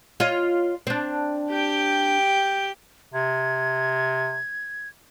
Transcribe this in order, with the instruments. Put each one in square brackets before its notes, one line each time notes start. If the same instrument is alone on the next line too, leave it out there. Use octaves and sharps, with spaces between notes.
[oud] F4 C#5 D#5
C4 D4
[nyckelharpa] G4 G5
[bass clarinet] C3 [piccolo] G#6